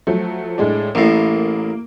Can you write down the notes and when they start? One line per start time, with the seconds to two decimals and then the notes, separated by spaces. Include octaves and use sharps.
0.07 F3 F#3 A3
0.58 A2 G#3 D4
0.95 A1 A2 A#3